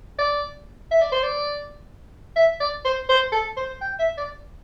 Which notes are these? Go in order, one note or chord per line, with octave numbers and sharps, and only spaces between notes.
D5
E5
D5
C5
D5
E5
D5
C5
C5
A4
C5
G5
E5
D5